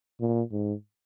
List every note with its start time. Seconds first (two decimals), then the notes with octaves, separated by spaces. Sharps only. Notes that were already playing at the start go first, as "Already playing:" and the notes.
0.20 A#2
0.51 G#2